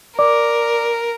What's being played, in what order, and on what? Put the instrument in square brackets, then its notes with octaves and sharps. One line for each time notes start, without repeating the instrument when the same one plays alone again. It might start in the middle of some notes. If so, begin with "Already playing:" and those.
[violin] A#4 [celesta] D5 D6